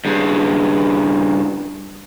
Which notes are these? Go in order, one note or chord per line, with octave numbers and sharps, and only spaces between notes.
G2 C#3